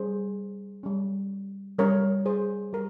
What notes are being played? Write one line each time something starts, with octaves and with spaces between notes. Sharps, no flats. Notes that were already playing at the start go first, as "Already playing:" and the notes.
Already playing: G3 C#4 G#4 C5
G3 C#4
G3 C#4 A#4 C#5
G#4 C5
G3 G4 A#4